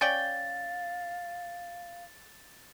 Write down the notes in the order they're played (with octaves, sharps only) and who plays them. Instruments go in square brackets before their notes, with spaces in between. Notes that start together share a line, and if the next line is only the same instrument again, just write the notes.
[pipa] C#4 D5 G5 [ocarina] F5 [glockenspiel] A6